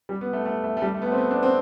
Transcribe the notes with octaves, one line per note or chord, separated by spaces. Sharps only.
G3
B3
A3
A3
A3
A3
G3
A3
B3
A3
C4
B3
D4
C4